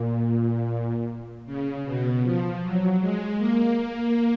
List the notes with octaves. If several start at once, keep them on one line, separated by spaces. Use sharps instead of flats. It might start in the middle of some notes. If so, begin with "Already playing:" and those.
Already playing: A#2
C#3
B2
F3
F#3
G#3
A#3